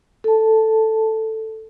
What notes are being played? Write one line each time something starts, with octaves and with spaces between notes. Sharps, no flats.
A4 A5